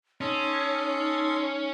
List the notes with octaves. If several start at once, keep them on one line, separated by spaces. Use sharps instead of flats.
C#4 D#4 A4 D#5 C6